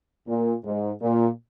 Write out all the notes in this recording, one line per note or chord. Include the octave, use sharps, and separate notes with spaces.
A#2
G#2
A#2